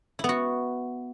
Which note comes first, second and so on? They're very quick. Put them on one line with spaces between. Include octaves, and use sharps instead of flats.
E4 B3 F#4